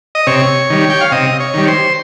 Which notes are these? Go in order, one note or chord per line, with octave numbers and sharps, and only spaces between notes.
D#5
C3 C#5
D#3 G3
G5
F5
C3 D#5
C#5
D#3 G3
C5